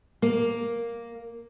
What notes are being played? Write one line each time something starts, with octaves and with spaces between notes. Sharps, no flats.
A#3